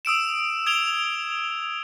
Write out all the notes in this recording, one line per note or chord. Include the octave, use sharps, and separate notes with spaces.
D#6 E6 D7 E7
D#6 G#6 D7 F7 G7